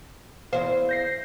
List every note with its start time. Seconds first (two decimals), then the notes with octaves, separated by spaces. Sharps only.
0.53 E2 C5 F5
0.89 G6 A#6 C7